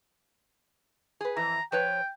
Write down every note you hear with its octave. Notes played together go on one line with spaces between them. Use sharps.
G#4 B4
F2 E3 A#5
F3 B4 C#5 G5